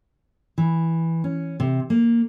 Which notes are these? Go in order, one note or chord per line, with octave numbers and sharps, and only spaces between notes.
E3
C#4
C3
A#3